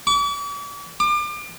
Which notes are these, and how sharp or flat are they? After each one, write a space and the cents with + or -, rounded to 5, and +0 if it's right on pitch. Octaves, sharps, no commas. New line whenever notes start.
D6 -45
D6 +35